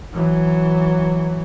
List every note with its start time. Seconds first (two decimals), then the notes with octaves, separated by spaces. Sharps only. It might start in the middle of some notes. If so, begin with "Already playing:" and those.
0.13 E3 F#3